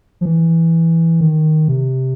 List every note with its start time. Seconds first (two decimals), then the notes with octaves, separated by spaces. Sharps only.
0.21 F3
0.25 E3
1.21 D#3
1.68 C3